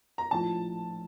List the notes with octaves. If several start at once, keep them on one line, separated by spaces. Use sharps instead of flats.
A#5
A#1 A2 F3 A5